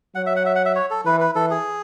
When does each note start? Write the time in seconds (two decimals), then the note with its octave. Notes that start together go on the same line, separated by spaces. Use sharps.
0.15 F#3 F#5
0.26 E5
0.36 F#5
0.46 E5
0.55 F#5
0.65 E5
0.75 C#5
0.91 A4
1.05 E3 B4
1.20 B4
1.35 E3 A4
1.51 G#4